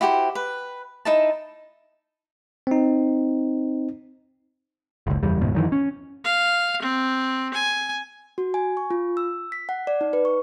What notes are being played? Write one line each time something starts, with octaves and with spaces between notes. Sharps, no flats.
E4 F#4 G4 C5
B4
D#4 E4 A5
C4 D#4
F#1 C#2
F#1 E2 G3
F1 D2 G#2 B2
F#2 D#3 E3
C#4
F5
C4
G#5
F#4
G#5
C#6
F4
E6
B6
F#5
D5
D#4
B4
C#6